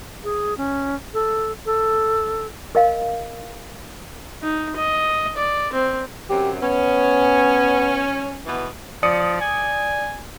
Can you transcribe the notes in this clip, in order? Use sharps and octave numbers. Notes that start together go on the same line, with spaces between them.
G#4
C#4
A4
A4
A#4 D#5 F5
D#4
D#5
D5
C4
F#2 C3 F#3 G4
B3 C#4
B2 E3 B3
F3 D5 D#6 C#7
G#5